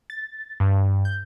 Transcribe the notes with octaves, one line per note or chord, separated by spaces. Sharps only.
A6
G2
G6